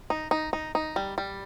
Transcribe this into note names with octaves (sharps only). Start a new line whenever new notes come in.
D#4
D#4
D#4
D#4
G3
G3